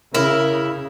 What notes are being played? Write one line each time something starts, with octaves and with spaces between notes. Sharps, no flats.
C#3 E4 A#4